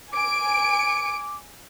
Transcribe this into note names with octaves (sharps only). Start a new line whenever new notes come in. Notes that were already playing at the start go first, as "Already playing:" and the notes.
G#5 D6 D7